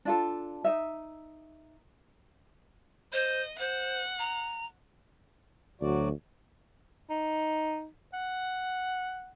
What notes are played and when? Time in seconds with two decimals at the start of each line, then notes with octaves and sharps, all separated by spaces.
0.05 D4 F4 A4
0.64 D#4 E5
3.13 C5 D#5
3.59 C5 F#5
4.19 A#5
5.81 D2 F#3 F#4 D5
7.10 D#4
8.13 F#5